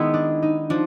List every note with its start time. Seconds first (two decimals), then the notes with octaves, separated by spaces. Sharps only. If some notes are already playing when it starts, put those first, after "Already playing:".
Already playing: D#3 G#3 B3 E4
0.14 D4
0.42 D#4
0.70 F3 D4